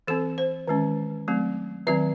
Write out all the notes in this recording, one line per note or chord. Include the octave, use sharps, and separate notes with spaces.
E3 C4 A4
C5
D#3 G#3 C#4
F#3 A3 C4
D#3 F#3 C4 E5